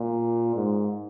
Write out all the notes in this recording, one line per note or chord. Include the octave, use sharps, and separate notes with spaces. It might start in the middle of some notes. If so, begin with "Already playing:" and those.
Already playing: A#2
G#2